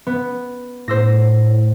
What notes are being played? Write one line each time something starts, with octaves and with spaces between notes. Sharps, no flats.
B3
A2 C5 E6 A#6